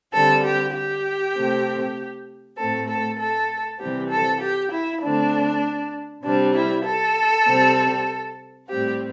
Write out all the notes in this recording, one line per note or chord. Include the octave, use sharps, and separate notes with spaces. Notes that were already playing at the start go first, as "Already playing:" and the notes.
D3 G3 C4 A4
G4
G4
C3 A3 C4
A2 A3 C4 A4
A4
A4
C3 E3 G3 C4 G4
A4
G4
E4
D3 A3 C4 D4
C3 G3 C4 D4
E4
A4
C3 G3 C4
A2 G3 C4 G4